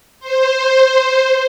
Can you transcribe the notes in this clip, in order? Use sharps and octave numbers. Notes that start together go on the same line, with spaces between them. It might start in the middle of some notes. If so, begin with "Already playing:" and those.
C5